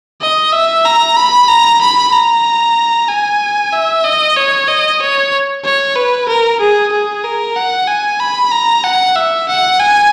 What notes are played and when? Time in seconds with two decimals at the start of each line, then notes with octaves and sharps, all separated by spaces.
0.21 D#5
0.52 E5
0.85 A#5
1.17 B5
1.48 A#5
1.81 B5
2.12 A#5
3.09 G#5
3.72 E5
4.04 D#5
4.36 C#5
4.68 D#5
5.00 C#5
5.64 C#5
5.96 B4
6.28 A#4
6.60 G#4
6.92 G#4
7.24 A#4
7.56 F#5
7.88 G#5
8.20 B5
8.51 A#5
8.84 F#5
9.16 E5
9.48 F#5
9.80 G#5